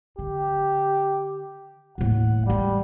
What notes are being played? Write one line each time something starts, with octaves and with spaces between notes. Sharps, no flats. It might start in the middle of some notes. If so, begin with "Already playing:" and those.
D3 G4
D#2 A2 F#5
E2 G3 G#3